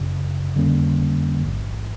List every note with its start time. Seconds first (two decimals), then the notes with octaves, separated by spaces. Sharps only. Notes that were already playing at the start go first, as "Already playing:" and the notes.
Already playing: G1 F#2 C#3
0.54 F2 D3 G3 A#3 C#4
1.40 A1 G#2 E3